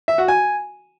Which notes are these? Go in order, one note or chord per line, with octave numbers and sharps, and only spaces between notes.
E5
F#4
G#5